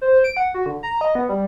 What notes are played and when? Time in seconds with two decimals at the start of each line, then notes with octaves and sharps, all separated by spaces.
0.01 C5
0.24 D7
0.37 F#5
0.54 F#4
0.66 D3
0.83 A#5
1.01 D#5
1.15 B3
1.29 G3